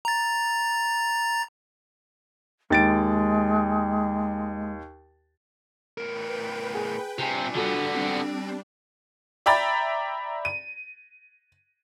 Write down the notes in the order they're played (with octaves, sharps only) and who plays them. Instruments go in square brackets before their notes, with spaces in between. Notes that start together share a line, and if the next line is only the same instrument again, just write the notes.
[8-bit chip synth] A#5 A6
[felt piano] D#2 A6 D7 [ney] G#3
[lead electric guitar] A2 A#4 [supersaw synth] B4 G5
[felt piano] G#4
[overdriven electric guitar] C3 [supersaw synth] G3 D4 [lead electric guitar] F4 G#5
[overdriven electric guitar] D3 B3 [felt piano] F#4 A4
[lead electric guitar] C4
[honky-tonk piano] D5 E5 G5 A#5 B5 A6
D#7